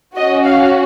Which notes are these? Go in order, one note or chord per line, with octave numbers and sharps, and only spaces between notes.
C#4 F#4 D#5
F5